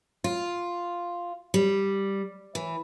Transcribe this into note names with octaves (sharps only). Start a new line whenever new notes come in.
F4
G3
E3